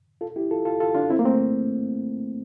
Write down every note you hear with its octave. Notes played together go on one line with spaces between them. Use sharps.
F4 A4
E4 G4
F4 A4
F4 A4
F4 A4
D4 F4
C4 E4
A#3
A3 C4